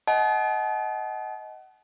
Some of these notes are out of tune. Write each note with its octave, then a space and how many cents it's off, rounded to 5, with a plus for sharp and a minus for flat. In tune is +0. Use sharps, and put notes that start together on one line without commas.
D#5 +15 F#5 +30 A5 -40